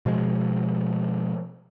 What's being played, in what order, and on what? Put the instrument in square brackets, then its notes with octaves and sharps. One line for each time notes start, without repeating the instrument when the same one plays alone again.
[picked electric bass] B2 F3 G#3